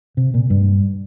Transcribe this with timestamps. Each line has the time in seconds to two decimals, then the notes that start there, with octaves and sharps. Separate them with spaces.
0.17 C3
0.34 A#2
0.50 G2